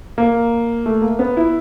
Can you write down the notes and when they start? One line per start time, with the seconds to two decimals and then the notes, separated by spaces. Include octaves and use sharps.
0.18 A#3
0.86 A3
1.02 A#3
1.19 B3
1.37 E4